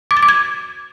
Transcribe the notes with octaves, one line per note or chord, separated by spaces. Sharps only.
D6
A6
D6
G#6